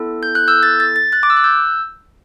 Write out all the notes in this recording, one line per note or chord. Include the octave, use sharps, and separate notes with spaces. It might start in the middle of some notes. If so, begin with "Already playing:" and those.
Already playing: B3 E4 A4
G6
F#6
E6 G6
A6
A6
A6
F#6 A6
D6
E6
F#6
E6 G6